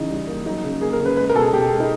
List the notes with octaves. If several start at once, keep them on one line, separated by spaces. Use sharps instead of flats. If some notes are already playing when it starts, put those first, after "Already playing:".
Already playing: C#3 E3 D#4
G3
A#3
F#3 D#4
C#3
A#3 G#4
A#4
C#3
B4
G#3 B4
A#4
B2 A4
G#4
B2 G4
G#3
D#4